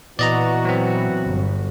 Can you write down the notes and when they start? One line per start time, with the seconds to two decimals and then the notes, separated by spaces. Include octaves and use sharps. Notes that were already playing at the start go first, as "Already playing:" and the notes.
0.19 A#2 E3 B3 F#4 D5 D#5 A#5
0.65 F#3 C4
1.23 G1